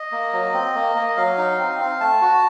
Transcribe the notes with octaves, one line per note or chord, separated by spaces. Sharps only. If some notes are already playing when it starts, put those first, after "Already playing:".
Already playing: D#5
A#3
F#3
C4
A#3
A#3
F#3 F5
D#4
C4
C4
A3 A5
F#4